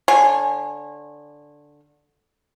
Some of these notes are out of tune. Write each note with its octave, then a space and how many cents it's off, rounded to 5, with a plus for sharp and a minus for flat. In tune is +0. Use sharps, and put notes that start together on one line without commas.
D3 +0 C#5 -30 G#5 +0